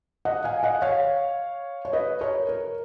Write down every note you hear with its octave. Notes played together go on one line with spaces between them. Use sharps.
D#5 F#5
F5 G#5
D#5 F#5
C#5 F5
C#5
B4 D#5
A#4 C#5
A#4